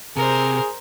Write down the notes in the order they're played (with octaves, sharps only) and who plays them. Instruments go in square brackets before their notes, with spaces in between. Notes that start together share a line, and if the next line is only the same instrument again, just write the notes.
[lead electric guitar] C3 [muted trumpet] G#4 [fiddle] A#4 C5